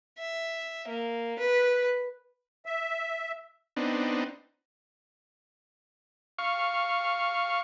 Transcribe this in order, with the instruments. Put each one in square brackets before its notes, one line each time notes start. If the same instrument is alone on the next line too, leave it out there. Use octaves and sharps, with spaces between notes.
[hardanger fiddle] E5
A#3
B4
[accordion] E5
[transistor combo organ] B3 C4 D4 D#4
F5 C#6